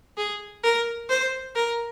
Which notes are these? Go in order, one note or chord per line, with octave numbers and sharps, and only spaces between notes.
G#4
A#4
C5
A#4